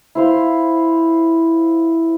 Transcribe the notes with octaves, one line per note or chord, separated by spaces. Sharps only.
E4 C5 F5